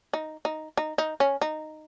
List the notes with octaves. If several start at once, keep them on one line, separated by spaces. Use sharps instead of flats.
D#4
D#4
D#4
D#4
C#4
D#4